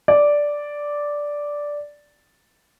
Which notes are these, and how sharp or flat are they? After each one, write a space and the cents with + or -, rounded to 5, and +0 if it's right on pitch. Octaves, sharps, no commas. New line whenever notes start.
D5 -5